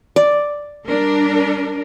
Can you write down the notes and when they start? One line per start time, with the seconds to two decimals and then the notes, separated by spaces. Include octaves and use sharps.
0.16 D5
0.87 G3 D4 A#4